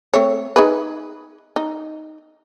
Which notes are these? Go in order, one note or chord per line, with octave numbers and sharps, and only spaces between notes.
A3 C4 C#5
D#4 G#4 B4
D#4